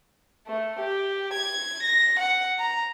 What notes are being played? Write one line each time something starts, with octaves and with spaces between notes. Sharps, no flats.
A3
G4
G#6
A#6
F#5
A#5